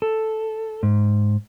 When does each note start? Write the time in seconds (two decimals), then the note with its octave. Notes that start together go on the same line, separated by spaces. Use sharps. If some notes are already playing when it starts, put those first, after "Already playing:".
0.02 A4
0.83 G#2